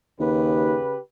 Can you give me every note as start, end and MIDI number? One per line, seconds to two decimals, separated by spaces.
0.20 0.76 39
0.20 0.98 49
0.20 0.98 67
0.20 0.98 71